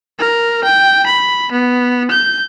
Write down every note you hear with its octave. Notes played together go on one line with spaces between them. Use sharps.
A#4
G5
B5
B3
G6